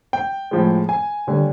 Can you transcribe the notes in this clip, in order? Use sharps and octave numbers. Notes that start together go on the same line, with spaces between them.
G5
A2 F3 G#3
G#5
D#2 D3 G3